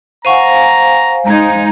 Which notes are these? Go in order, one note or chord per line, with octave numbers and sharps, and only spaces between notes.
C5 F5 F#5 G#5 A#5 C#6 D#7
G#3 D#4 A#5 G#6